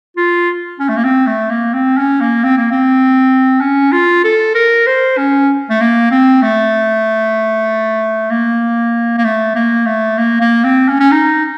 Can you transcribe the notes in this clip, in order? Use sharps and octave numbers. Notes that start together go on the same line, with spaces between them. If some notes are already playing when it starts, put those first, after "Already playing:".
F4
C#4
A3
A#3
C4
A3
A#3
C4
C#4
A#3
C4
A#3
C4
C#4
F4
A4
A#4
C5
C#4
A3
A#3
C4
A3
A#3
A#3
A3
A#3
A3
A#3
A#3
C4
C#4
C#4
D#4